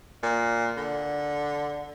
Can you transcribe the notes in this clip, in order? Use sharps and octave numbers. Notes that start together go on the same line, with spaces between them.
A#2
D3